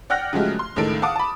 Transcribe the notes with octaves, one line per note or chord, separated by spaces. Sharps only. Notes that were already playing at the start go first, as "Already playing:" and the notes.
D5 F#5 G5 F6 F#6 A#6
C#3 F3 F#3 G#3 A3 G4
C6
C#2 A2 D#3 A4 D7
F5 F#5 A5 D6 D#6
A5 B5